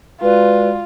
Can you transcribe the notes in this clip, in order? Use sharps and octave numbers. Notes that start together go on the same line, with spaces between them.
G#3 F4 F#4 B4 D5